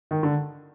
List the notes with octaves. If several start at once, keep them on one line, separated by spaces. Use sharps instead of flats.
D#3
D3